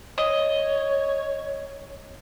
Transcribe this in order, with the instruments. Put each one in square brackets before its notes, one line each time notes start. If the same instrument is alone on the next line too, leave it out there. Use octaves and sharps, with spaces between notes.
[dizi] C#5 [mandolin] D#5